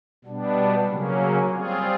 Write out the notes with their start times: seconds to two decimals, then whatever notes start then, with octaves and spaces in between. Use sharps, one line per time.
0.24 B2 G3 B3 D4
0.88 C#3 F#3 A#3 C#4
1.52 G3 C4 F4 G#4